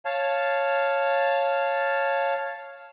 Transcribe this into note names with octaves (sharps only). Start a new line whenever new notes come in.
C#5 F5 A5